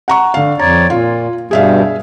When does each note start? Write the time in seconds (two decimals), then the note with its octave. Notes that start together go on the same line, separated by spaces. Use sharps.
0.08 F#5 A#5 C#6
0.34 D3 F5
0.59 F2 C#5 D5 A#5
0.90 A#2 F4
1.51 G2 B2 G3 G#4 E5 F5